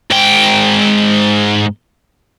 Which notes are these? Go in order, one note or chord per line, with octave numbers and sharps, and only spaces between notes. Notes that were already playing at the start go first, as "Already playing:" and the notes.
G#2 G5